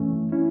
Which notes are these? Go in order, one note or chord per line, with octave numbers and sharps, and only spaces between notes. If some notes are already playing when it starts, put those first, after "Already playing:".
Already playing: F#2 E3 A3 C#4
C#4 E4